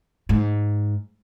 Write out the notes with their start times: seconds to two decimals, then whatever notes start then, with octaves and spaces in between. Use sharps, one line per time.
0.29 G#2